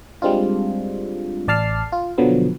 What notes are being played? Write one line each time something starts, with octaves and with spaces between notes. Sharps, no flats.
G3 G#3 C4 D4 F4
A1 D5 A5 F6 C7
F4
B2 D3 F3 F#3 B3